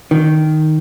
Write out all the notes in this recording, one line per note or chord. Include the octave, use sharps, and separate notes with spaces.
D#3